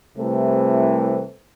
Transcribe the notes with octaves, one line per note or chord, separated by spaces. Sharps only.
C2 C3 E3 A3